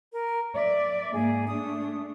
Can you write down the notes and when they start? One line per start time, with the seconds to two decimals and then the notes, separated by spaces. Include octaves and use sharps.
0.13 A#4
0.55 D5 E5
1.14 G#2 A#3 G#4
1.48 A3 D4 D#6